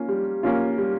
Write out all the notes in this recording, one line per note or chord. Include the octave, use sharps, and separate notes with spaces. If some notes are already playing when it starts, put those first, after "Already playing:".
Already playing: A#3 C#4 F4
G3
A#3 C#4 F4
G3